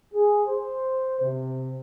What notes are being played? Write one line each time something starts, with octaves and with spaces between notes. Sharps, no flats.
G#4
C5
C3